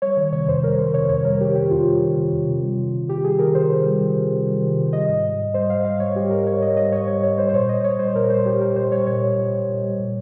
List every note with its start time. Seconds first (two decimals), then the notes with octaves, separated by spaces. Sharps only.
0.02 G3 C#5
0.17 D#3 C#5
0.32 C3 C#5
0.48 F2 C5
0.63 G3 A#4
0.78 D#3 C5
0.94 C3 C#5
1.09 F2 C#5
1.25 G3 A#4
1.40 D#3 G4
1.55 C3 G4
1.71 F2 F4
1.86 G3
2.02 D#3
2.16 C3
2.32 F2
2.48 C3
2.63 G3
2.78 D#3
2.93 C3
3.08 C3 G4
3.24 G3 G#4
3.39 D#3 A#4
3.55 C3 C5
3.70 C3
3.86 G3
4.01 D#3
4.16 C3
4.32 C3
4.47 G3
4.62 D#3
4.77 C3
4.93 G3 D#5
5.09 G#2
5.24 G3
5.39 G#2
5.54 G3 C5
5.70 G#2 F5
5.85 G3 F5
6.00 G#2 C#5
6.16 G3 G4
6.31 G#2 A#4
6.46 G3 C#5
6.62 G#2 D#5
6.77 G3 D#5
6.92 G#2 C#5
7.08 G3 C#5
7.23 G#2 C#5
7.38 G3 C5
7.49 C5
7.53 A#2 C#5
7.69 G3 D#5
7.84 A#2 C#5
7.99 G3 C5
8.15 A#2 A#4
8.30 G3 C5
8.45 A#2 G4
8.61 G3 A#4
8.76 A#2 C5
8.92 G3 C#5
9.07 A#2 C#5
9.23 G3
9.38 A#2
9.53 G3
9.69 A#2
9.84 G3
9.99 A#2